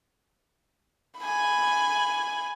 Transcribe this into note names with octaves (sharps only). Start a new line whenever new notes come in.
G#5 B5